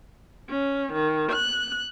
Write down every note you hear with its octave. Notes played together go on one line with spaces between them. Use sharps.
C#4
D#3
F#6